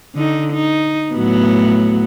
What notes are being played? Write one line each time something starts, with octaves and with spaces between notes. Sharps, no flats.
D3 D#4
D#4
A2 F#3 B3